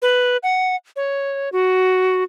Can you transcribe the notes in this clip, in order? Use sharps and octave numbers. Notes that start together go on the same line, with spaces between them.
B4
F#5
C#5
F#4